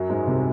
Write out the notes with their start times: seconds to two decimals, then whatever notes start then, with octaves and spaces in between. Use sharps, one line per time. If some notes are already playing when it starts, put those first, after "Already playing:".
Already playing: F#2 F#3
0.10 G#2 G#3
0.27 C2 C3